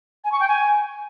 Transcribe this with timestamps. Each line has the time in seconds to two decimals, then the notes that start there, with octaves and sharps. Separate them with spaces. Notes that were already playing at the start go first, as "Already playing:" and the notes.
0.24 G#5
0.32 C#6
0.39 G5
0.47 G#5